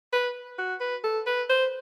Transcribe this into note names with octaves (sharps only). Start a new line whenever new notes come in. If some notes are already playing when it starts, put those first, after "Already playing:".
B4
F#4
B4
A4
B4
C5